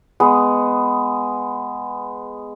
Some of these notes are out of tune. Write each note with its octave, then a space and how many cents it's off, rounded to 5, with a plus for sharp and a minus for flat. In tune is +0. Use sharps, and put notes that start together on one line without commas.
G#3 +0 B3 +10